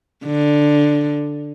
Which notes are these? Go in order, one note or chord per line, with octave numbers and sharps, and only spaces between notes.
D3